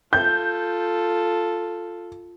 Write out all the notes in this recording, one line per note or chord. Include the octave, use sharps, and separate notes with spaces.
F4 A4 G6